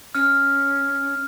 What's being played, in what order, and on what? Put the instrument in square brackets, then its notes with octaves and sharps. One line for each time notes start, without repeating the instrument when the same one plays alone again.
[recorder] C#4 [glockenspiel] F6